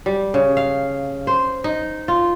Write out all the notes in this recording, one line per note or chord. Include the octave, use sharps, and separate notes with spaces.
G3
C#3
F5
C5
D#4
F4